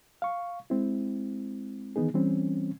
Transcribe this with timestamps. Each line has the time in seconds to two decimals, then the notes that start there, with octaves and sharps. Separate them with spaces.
0.22 F5 C#6
0.70 G#3 C4 E4
1.96 D#3 E3 B3 D#4 G#4
2.14 E3 G3 C4 C#4